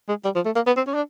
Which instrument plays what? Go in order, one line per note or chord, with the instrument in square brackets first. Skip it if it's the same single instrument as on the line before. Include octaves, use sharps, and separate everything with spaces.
[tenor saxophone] G#3
G3
F3
A3
A#3
B3
C4
C#4
D4